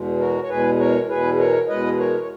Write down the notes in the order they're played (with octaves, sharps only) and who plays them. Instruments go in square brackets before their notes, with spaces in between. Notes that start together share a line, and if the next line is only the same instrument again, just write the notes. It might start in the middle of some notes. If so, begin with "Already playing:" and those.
Already playing: [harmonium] E2 B2 G#3
F#4 A#4
C#5
E2 B2 G#3 G#4 B4
A#4 C#5
E2 B2 G#3 G#4 B4
A#4 C#5
E2 B2 G#3 B4 D#5
A#4 C#5
C#5